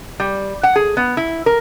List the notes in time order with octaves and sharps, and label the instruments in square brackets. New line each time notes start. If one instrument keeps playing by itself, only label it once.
[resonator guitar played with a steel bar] G3
F#5
G#4
B3
E4
A#4